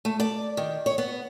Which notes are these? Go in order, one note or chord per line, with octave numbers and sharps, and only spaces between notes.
A3
D5
D#3
C#5
B3